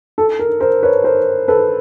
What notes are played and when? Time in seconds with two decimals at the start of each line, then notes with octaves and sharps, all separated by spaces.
0.18 A4
0.39 A#4
0.60 A#4 C5
0.83 B4 C#5
1.04 A#4 C5
1.48 A4 B4